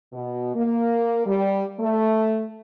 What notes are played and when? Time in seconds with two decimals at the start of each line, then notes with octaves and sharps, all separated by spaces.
0.13 B2
0.56 A#3
1.26 G3
1.80 A3